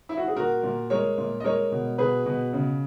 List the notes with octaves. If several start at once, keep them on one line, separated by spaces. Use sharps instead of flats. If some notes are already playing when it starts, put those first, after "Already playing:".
E4
F#4
G#4
A#2 F#4 A#4
A#2
G#3 A#4 C#5
A#2
D#5
G#3 A#4 C#5
B2
B2 G#4 B4
B2
C#3